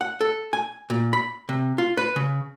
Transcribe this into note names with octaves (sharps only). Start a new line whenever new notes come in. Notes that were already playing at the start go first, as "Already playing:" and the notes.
F#5
A4
G#5
A#2
B5
C3
F4
B4
C#3